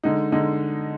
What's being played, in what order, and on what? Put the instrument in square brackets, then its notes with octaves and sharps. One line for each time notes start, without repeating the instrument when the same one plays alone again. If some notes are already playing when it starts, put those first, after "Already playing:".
[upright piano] D3 G#3 D#4
D3 G#3 D#4